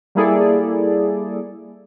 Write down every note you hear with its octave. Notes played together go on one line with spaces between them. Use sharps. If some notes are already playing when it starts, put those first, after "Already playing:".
G3 A#3 E4 G#4 A4 D5